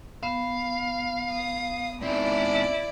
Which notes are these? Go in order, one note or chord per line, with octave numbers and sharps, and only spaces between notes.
B3 F5
D#6
C4 D#4 E4 D5